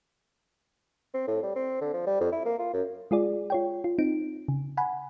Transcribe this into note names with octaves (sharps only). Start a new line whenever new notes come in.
C4
A2
G3
C4
D3
F3
G3
F2
E4
A#3
F4
F#2
G#3 F4 G#4 D5
F4 C#5 G5
F4
C4 D#4 D7
C#3
F#5 G#5 B5